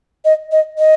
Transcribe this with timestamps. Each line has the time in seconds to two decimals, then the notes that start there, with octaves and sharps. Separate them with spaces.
0.25 D#5
0.52 D#5
0.79 D#5